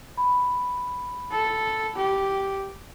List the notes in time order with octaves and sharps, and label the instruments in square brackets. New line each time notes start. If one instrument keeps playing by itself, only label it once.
[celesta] B5
[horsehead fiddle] A4
G4